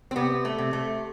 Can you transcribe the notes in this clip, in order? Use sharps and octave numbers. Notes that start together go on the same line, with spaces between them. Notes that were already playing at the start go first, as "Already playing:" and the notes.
C4
C3 B3
A3
C3
A3